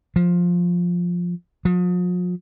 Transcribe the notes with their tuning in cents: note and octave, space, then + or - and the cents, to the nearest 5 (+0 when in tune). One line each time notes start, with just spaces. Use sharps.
F3 +10
F3 +45